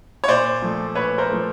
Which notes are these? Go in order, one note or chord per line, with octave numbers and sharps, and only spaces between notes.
C#5
A#2 C5 D5
F3 A3
A#2 B4 C#5
A#4 C5
F3 A3